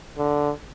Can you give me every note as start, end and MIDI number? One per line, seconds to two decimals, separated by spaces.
0.18 0.50 50